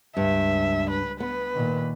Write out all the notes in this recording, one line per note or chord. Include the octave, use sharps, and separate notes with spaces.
C#2 G2 E5
B4
B3 B4
A#2 D#3